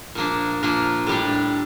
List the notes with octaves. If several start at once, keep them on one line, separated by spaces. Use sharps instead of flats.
A#2 F3 A#3 D4
A#2 F3 A#3 D4
A2 G3 D4